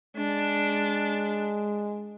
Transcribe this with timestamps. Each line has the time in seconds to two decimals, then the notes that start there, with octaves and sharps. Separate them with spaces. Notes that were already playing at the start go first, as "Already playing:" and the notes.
0.17 G#3 D4